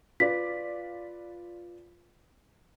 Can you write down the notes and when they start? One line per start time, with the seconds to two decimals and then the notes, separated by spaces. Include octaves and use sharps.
0.20 F4 B4 D5 B6